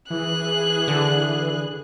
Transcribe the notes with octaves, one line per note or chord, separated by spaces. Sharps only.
E3 G#4 F#6
D3